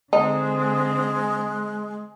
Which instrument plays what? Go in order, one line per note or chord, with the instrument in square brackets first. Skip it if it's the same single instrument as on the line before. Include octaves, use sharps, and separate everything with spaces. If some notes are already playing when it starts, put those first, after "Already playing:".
[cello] D3 C4 [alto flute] G#3 [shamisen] D#4